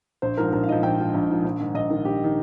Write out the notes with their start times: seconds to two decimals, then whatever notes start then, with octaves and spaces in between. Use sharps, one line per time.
0.22 A#1 C5
0.37 G#2 F3 A#4
0.53 A#1 A#4
0.64 F5
0.68 G#2 F3 D#5
0.83 A#1 G5
0.99 G#2 F3
1.14 A#1
1.30 G#2 F3
1.44 A#1
1.60 G#2 D#3
1.75 A#1 D#5
1.90 G#2 D#3 A#4
2.05 A#1 G4
2.24 D#3